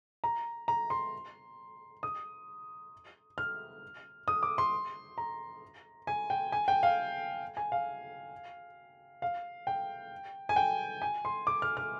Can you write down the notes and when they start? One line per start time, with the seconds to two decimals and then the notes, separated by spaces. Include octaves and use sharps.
0.24 A#5
0.68 A#5
0.90 C6
2.03 D#6
3.38 F6
4.28 D#6
4.43 D6
4.58 C6
5.18 A#5
6.07 G#5
6.30 G5
6.52 G#5
6.68 G5
6.83 F5
7.57 G#5
7.72 F5
9.22 F5
9.67 G5
10.49 G#5
10.56 G5
11.02 G#5
11.25 C6
11.47 D6
11.62 F6
11.77 F6